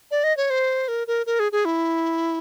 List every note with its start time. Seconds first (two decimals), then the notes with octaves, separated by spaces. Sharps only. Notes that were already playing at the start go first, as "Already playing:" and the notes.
0.11 D5
0.24 D#5
0.37 C#5
0.50 C5
0.88 A#4
1.07 A#4
1.26 A#4
1.40 G#4
1.52 G#4
1.65 E4